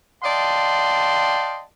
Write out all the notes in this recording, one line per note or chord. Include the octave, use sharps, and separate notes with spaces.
D5 D#5 F5 G5 A5 C6